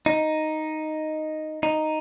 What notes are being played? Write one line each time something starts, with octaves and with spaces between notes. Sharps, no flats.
D#4
D#4